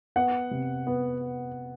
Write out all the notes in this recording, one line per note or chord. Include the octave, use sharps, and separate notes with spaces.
B3 F#5
C3
B3